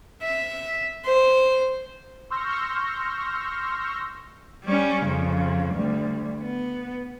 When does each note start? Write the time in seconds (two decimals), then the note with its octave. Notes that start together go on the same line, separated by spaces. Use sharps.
0.22 E5
1.05 C5
2.30 C6 C#6 E6 F6 G6 A#6
4.65 G3 C#4
5.06 F2 C#3
5.74 D2 G3
6.43 B3